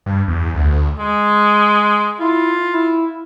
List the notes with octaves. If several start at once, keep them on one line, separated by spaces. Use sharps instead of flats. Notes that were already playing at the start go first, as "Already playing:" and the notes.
G2
E2
D2
G#3
E4 F4
E4